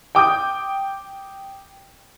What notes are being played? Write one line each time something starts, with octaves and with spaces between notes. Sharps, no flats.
G5 D6 D#6 G6